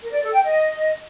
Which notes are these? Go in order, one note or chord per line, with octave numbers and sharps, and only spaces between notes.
A#4
D5
A4
G5
D#5